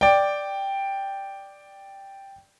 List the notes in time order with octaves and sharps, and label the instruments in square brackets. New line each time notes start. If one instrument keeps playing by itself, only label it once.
[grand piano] D5 G5